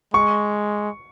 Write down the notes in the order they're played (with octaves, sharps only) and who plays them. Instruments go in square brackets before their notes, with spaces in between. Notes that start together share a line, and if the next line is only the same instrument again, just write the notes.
[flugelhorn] G#3 [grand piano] C#6